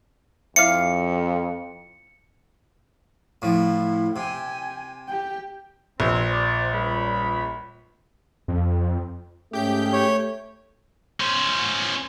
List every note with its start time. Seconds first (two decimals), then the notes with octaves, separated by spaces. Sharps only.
0.56 F2 E4 D5 F5 C#7
3.42 A2 F3 E4
4.16 C3 G5 G#5
5.08 G4 G5
6.00 A#1 G2 F3 C4
6.30 C5 D5
6.73 C#2 G3 B5
8.48 F2
9.53 G#2 A3 C#4 G4 G#4 G6
9.93 C#5
11.20 C#4 C5